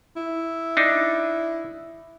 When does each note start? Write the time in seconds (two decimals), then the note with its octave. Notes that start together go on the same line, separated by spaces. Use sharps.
0.16 E4
0.77 D4 D#4